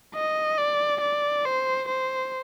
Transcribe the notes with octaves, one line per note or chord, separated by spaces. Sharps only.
D#5
D5
D5
C5
C5